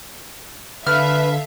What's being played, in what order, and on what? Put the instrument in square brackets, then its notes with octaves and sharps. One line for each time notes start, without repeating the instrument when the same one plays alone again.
[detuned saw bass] D3 [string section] A4 E5 F5 [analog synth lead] B4 [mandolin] F6